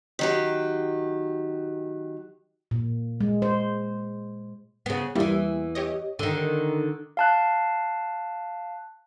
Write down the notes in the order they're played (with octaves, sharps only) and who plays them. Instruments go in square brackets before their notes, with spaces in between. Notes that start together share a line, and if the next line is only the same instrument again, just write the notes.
[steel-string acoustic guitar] D#3 F#3 G4
[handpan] A#2
G#3
C5
[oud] C#3 B3
[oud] E2 E3 [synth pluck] G3 A#3 E4
[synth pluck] G4 C#5 D#5
[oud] D3 D#3
[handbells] F5 A5 F#6